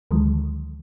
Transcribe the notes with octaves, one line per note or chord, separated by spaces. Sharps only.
D2 D3 D#3 F3 F#3 G#3